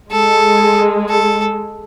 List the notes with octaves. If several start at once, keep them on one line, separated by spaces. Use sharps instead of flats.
G#3 A4
A4